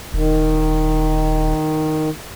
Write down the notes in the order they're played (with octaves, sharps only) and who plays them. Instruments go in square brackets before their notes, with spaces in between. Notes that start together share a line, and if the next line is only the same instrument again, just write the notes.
[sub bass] D#1 [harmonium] D#3